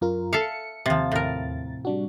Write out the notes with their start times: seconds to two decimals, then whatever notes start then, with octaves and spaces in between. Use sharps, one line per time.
0.01 F#2 F4 A#4
0.33 A4 E5 F5 C#7
0.86 D#2 C3 F3 A6
1.12 A2 A#4
1.85 G3 D4 F#4